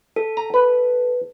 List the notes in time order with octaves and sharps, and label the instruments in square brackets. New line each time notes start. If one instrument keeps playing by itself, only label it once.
[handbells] A4
[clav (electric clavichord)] A#5
B4